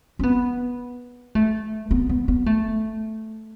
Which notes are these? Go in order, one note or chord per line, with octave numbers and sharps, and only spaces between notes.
C#4
B3
A3
B3
B3
B3
A3